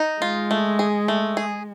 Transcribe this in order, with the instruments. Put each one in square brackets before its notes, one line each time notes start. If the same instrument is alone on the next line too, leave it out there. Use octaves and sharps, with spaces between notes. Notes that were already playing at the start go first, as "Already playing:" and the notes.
Already playing: [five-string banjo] D#4
[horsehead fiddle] G#3 [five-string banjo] F4
[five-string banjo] A3
G#4
A3
G#4